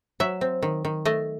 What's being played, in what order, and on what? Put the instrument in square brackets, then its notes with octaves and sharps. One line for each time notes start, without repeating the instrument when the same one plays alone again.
[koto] F#3 E5
C4
D#3
D#3
A3 D#5